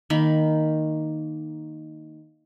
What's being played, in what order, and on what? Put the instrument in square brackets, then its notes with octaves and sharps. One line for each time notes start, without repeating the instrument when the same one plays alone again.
[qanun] D#3 A#3 B5